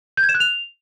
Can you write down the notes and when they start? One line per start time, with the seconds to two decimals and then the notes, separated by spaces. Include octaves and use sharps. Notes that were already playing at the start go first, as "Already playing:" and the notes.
0.17 G6
0.23 G#6
0.29 E7
0.35 F#6
0.40 F7